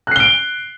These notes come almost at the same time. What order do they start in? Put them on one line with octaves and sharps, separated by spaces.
F#6 C7 G7 D7